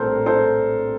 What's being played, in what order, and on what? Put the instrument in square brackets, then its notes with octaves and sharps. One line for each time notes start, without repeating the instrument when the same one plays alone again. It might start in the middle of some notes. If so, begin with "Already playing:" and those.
Already playing: [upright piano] A#1 A2 G3 C4 A4 A#4 C5
A4 C5